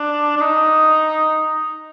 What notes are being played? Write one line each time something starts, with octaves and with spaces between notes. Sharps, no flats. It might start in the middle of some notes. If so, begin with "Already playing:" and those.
Already playing: D4
D4
D#4